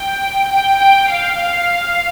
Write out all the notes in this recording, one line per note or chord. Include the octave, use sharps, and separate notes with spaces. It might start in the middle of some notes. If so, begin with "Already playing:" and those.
Already playing: G5
G5
G5
F5
F5